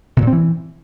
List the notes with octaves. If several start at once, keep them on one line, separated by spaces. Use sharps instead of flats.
C3
A#2
C4
E3